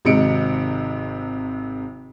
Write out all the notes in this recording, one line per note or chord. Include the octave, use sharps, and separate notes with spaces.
G#1 C3 G#3 D#4 C#7 D7